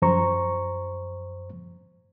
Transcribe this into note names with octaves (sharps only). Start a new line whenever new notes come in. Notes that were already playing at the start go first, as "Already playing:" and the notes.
F#2 F3 C5 A#5 C#6